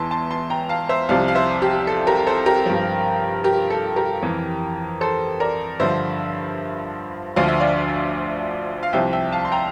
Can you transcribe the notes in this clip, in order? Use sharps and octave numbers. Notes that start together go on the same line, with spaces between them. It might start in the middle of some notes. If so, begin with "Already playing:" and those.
Already playing: E2 E3 E5 A5 C6
A5 C6
A5 C6
G5 A#5
F5 A5
C5 E5
C2 C3 F3 D5 F5
F5
C5 E5
G4
A4
G4 A#4
A4 C5
G4 A#4
G2 F3
G4 A#4
A4
G4 A#4
F2 E3
A4 C5
A#4 D5
G2 D3 F3 C5 E5
D2 D3 F3 F5
E5
D5 F5
F5
C2 C3 F3 E5 G5
E5 G5
F5 A5
C6
G5 A#5